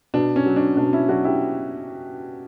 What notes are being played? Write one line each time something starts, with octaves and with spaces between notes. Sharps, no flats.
B2 D4
C#4
F#3
D4
B2 D4
C#4 E4
F#3 D4 F#4
E4 G4